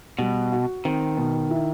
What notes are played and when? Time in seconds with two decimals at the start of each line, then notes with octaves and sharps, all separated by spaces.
0.19 B2 G3
0.52 F#4
0.85 D#3 C4
1.17 B2
1.50 E4